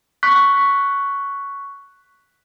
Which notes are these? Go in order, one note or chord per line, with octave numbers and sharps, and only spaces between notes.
C#6 F#6 B6